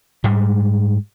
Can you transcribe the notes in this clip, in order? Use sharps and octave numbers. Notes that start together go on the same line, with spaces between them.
G#2 G3 G#3